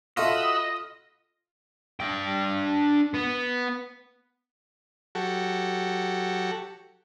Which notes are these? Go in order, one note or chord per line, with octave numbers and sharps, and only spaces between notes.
F4 F#4 A4 D#5 E5 B5 C#6 E6
D4 G5
B3
F#3 F#4 G4 A4